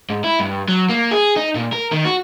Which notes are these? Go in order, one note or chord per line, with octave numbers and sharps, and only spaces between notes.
G#2
E4
G2
F#3
A#3
G#4
D#4
A#2
A#4
D#3
F#4